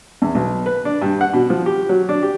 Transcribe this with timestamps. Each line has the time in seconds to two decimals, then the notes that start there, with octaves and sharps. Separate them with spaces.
0.22 E2
0.35 B1
0.66 B4
0.85 D4
1.02 G2
1.21 F#5
1.33 B2
1.50 F3
1.66 G4
1.89 F#3
2.09 D4
2.23 G4